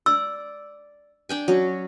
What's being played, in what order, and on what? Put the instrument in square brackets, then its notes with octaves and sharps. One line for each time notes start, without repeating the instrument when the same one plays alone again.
[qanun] D5 [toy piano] E6
[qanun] D4 G5 G#5
F#3 C#4